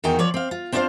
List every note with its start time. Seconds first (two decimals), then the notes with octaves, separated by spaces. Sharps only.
0.04 E2 D#3 D#4 F#4 G5
0.19 F3 C#5 D5
0.34 C4 F5
0.51 F4
0.72 C4 D4 F4 B4 C5 F5